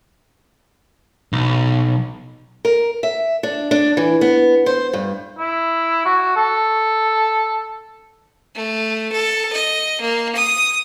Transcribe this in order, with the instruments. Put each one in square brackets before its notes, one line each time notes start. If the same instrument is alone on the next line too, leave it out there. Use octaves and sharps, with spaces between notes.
[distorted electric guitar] B1
[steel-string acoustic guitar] A#4
E5
D4
D4
E3
B3
C5
G2
[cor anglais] E4
F#4
A4
[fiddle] A3
A4
D#5
A#3
D#6